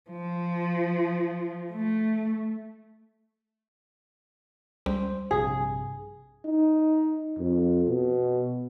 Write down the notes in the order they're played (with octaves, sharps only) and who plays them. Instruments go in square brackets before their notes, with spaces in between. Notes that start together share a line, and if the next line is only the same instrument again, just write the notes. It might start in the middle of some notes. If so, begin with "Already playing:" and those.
[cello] F3
A3
[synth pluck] C#2 G3 [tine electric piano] C5
[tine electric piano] A#1 G2 C3 [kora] G#4
[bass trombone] D#4
F2
B2